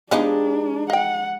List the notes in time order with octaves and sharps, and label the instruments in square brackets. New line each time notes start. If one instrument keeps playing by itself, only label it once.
[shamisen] F3 B3 D#5 [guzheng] G#3 D#4 G4 [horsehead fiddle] D4
[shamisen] D#5 G5 [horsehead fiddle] F#5